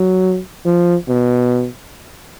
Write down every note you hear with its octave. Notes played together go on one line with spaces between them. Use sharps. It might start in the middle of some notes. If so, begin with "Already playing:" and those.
Already playing: F#3
F3
B2